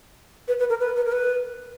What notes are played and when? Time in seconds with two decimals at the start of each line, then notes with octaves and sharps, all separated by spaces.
0.48 B4
0.59 B4
0.70 A#4
0.80 B4
0.96 B4
1.06 A#4
1.12 B4